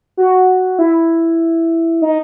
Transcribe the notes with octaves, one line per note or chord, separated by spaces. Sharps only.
F#4
E4
D#4